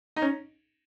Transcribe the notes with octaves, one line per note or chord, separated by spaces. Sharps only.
D#4
C#4